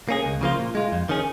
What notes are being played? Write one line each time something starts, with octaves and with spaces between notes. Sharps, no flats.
A#3 C#4 G#4
C#2
C#3 F3 A#3 F4
A#2
G#3 F4
F2
D#3 C#4 G#4